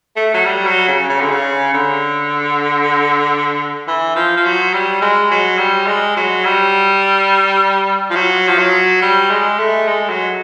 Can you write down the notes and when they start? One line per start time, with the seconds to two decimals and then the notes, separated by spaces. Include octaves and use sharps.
0.16 A3
0.34 F#3
0.45 G3
0.67 F#3
0.88 C#3
1.10 C#3
1.20 D3
1.30 C#3
1.74 D3
3.87 E3
4.16 F3
4.37 F3
4.45 F#3
4.73 G3
5.02 G#3
5.31 F#3
5.58 G3
5.87 G#3
6.17 F#3
6.45 G3
8.11 F3
8.16 F#3
8.48 F3
8.59 F#3
9.02 G3
9.31 G#3
9.59 A3
9.88 G#3
10.10 F#3